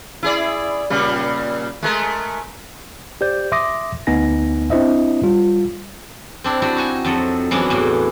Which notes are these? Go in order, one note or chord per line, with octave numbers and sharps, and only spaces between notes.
E4 G#4 D5
A#2 C#3 G3
G#3 A3 A#4
G4 C5 D5 G6
E5 C6 D6 D#6 A#6
D2 B3 D#4 G#5 A#6
C4 D4 E4 C5 D#5 E5
G3 F4
C4 D4 E4
D4 E4 F#4 G4
D#4 F#4 G#5
F2 F#3 A4 F#5
E3 F#3 B3 C#4 D4 E4
E2 A2 E4